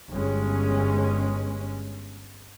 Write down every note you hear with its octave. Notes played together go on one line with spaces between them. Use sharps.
G1 G#3 C#4